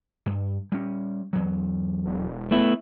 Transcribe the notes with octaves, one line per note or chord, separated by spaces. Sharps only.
G2
G3 C#4
E2 F#3
E1
A3 B3 E4